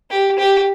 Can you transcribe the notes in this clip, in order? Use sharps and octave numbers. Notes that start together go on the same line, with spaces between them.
G4
G4